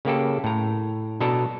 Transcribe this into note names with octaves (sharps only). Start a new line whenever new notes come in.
C#3 A#3 G4 A4
A2 A#5
B2 D4 A4 A#5